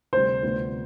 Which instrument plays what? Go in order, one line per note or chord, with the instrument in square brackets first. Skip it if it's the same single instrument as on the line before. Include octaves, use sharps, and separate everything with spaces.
[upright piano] D2 C3 G3 [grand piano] C5
[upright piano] D2 C3 F3 B3 D4